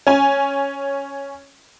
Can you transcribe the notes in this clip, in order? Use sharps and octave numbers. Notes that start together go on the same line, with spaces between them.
C#4 G#5